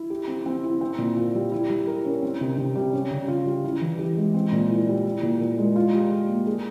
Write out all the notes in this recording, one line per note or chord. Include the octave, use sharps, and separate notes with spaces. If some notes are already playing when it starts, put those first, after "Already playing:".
Already playing: E4
G4
C4
C4
E4
C4
A#2
F4
G3
E4
G3
A#4
C#4
C4
C3
C3
G3
C#4
C#3
F4
G3
E4
E3
G4
G#3
C4
A#2
E4
G3
E4
A#2
A#4
G#3
F4
G3
G#4
A#3
G#4